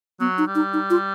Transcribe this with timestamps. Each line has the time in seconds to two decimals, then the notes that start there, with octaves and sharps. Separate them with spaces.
0.20 F#3 B3
0.38 D#4
0.47 G3
0.55 D#4
0.73 D#4
0.90 F4